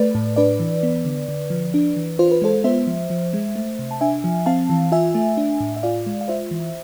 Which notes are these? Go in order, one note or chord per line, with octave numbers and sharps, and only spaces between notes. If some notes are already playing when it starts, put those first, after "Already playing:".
Already playing: A3 B4 D5
A2
D4 B4 D5
E3
B3
D3
D3
F3
D4
E3
F4 C5
B4
G#3 A4 C5
B3 C5 E5
F3
F3
G#3
A3
C3
A5
D4 E5 G#5
F3
C4 F5 A5
E3
F4 E5 G#5
A3
D4
A2
E5
F4 D5 F5
G#3
F5
F4 C5 E5
E3